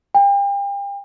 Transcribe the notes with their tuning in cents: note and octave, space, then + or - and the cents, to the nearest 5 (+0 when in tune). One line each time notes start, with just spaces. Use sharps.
G5 +35